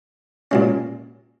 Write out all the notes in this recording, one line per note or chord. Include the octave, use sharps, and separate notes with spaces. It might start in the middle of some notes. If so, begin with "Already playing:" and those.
A#2 G#3 C#4